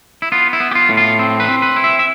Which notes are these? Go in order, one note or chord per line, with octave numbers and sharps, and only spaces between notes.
E4
B3 F4
E4
B3
G4
F4
A2
F4
C4
B4
C4
B4
E4
E5
E5